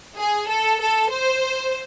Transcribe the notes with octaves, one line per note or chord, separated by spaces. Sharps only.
G#4
A4
A4
C5